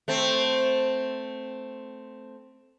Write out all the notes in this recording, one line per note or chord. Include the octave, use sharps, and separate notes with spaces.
A3 C4